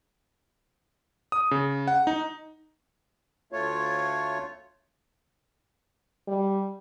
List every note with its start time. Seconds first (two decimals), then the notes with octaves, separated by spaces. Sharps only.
1.32 D#6
1.51 C#3
1.88 F#5
2.07 D#4
3.52 D2 A3 F4 C#5
6.28 G3